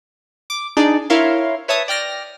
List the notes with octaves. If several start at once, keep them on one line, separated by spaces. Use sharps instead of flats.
D6
D4 D#4 G#4 D5
E4 A#4 C#5 E5 F5 C6
B4 C#5 E5 A5 D#6
D5 G5 F6 A#6